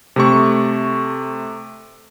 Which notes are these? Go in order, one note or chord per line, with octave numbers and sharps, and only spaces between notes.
C3 A3 C#6